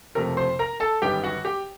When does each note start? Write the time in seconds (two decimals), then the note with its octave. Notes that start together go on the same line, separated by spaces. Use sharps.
0.15 F#1 F2 C3 F3 A3 A#4 A#5
0.37 C5 C6
0.59 A#4 A#5
0.80 A4 A5
1.02 G1 F#2 D#3 G3 B3 G4 G5
1.24 F#4 F#5
1.45 G4 G5